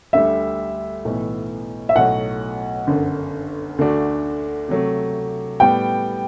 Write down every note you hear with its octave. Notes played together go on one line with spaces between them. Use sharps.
D2 D3 G3 E5
B1 A2 E3 B3
E5
B1 A2 F#3 A3 F#5
G1 F#2 D3
D2 D3 A3 D4 F#4
C3 F#3 A3
A2 G3 B3 G5